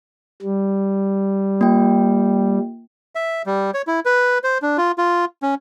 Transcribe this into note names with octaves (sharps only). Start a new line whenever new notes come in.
G3
A#3 F4 G5
E5
G3
C#5
E4
B4
C5
D4
F4
F4
C#4